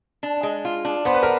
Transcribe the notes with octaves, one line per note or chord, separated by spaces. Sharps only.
D4
G#3
F4
D4
B3 C5
B4
A#4